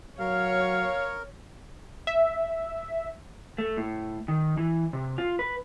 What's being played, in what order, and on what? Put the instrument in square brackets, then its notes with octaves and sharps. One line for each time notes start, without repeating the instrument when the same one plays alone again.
[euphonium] F#3 [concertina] A#4 [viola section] C#5 [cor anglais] F5
[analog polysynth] E5
[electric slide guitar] A3
A2
D#3
E3
C3
F4
B4